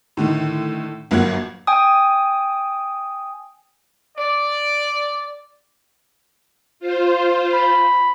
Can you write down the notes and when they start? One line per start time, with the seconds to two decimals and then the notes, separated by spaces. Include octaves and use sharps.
0.17 A2 D3 D#3
1.11 G1 F#3 A#3 F#4 F#5 G#6
1.67 G5 G#5 D#6
4.17 D5
6.80 F4 C5
7.53 B5